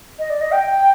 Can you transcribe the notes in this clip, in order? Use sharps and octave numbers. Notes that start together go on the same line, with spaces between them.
D#5
D5
D#5
G5